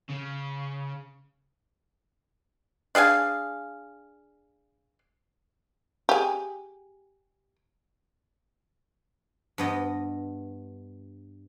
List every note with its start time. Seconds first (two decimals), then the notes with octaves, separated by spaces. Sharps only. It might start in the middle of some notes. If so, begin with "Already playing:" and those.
0.09 C#3
2.95 D4 G#4 F5 G#5
6.09 G4 G#4
9.58 G2 B3 D#5